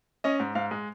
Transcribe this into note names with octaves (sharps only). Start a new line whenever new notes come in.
C#4 D#5
G#2
G#2 F5
G#3